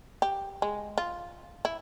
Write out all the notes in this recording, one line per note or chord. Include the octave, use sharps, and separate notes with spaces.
G4
G#3
F4
E4